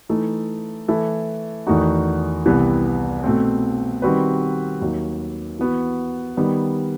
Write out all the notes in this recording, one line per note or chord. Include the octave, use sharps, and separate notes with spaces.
E3 A3 D#4 A4
E3 A3 E4 A4
E2 D#3 A3 D#4 F#4
C2 C3 E3 B3
B2 A3 C4
D#3 G3 C4 F#4 B4
D#2 D#3 F#3
E3 B3 F#4
D#3 G3 B3